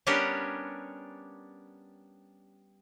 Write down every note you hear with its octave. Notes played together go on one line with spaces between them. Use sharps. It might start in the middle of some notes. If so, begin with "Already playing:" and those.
G3 B3 C#4 D4 G4 A#4